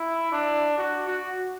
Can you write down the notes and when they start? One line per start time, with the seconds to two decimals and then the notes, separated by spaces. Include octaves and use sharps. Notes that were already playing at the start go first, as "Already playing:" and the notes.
Already playing: E4
0.32 D4
0.78 F#4
1.08 F#4